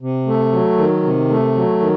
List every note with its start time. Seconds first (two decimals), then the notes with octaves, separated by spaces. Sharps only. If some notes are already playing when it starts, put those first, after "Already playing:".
0.01 C3
0.26 A3
0.52 F#3
0.78 D#3
1.04 C3
1.29 A3
1.55 F#3
1.80 D#3